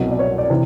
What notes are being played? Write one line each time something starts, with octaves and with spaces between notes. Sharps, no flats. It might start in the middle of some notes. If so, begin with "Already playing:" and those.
Already playing: C2 B2 F#3 D#5
D5
C#5
D5
C3 E3